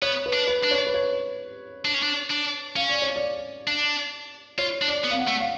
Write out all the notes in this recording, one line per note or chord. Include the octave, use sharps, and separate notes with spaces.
B3 C#5
B4
D4
B4
D4
C#5
B4
C#5
D4
C#4
D4
D4
C#4 F5
D5
C#5
D5
D4
F4 C#5
D4
D5
B3
F5
F#5
A3
F5